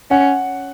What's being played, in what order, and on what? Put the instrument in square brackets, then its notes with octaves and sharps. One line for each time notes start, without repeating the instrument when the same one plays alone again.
[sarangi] C#4 [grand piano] F#5